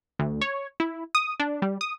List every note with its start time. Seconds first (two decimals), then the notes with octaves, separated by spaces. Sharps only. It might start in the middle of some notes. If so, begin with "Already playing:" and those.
0.19 D2
0.41 C#5
0.80 E4
1.15 D#6
1.40 D4
1.62 G3
1.81 D#6